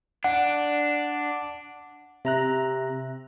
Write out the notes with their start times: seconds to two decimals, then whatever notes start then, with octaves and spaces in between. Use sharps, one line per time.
0.24 D4 F#5
2.25 C3 E5 A#5 F#6